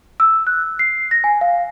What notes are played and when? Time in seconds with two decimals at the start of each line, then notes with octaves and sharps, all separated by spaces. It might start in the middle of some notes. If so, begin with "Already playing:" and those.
0.20 E6
0.47 F#6
0.79 C7
1.11 A#6
1.24 G#5
1.41 F5